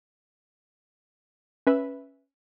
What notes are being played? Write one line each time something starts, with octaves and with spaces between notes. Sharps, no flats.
C#4 B4 E5 B5